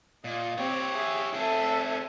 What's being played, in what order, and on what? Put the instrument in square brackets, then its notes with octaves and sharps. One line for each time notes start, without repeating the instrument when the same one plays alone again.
[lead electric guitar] A#2 [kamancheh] D#5
[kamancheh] C4 [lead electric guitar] G4 C#5
[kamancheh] G#4 E5
[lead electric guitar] C4 G#4 [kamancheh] A4 E5